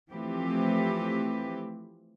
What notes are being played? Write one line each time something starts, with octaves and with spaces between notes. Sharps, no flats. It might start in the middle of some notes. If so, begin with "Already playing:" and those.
E3 F3 A3 C4 G4 B4